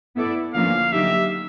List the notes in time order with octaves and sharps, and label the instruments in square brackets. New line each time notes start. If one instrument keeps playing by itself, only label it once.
[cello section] B3 E4 A4 D5
[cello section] D3 F3 A#3 C#4 F4 [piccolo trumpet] F5
[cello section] D3 F#3 A#3 D#4 G4 [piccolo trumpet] E5